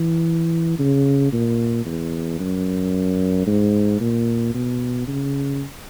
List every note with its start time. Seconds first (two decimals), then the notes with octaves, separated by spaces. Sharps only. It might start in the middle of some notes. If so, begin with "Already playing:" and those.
Already playing: E3
0.79 C#3
1.33 A#2
1.86 E2
2.40 F#2
3.47 G#2
4.00 A#2
4.54 B2
5.07 C#3